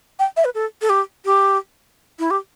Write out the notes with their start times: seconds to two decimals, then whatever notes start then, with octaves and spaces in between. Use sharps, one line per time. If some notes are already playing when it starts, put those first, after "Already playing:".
0.19 G5
0.37 E5
0.45 B4
0.55 A4
0.82 A4
0.89 G4
1.25 G4
2.19 E4
2.31 G4